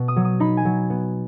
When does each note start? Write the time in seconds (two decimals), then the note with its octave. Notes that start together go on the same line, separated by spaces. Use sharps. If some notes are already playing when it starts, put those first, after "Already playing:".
Already playing: B2
0.08 D#6
0.16 F#3
0.25 D#6
0.40 D#4 B5
0.57 G#5
0.65 F#3
0.90 B3